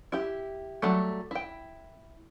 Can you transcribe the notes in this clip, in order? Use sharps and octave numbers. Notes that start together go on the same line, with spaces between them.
E4 G4
F#3 G3 A3
E4 G5